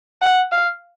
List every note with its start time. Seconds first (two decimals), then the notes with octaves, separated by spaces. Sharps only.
0.22 F#5
0.52 F5